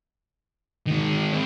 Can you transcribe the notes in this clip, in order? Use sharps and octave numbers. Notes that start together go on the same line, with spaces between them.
D#3 G#3
G#3 C4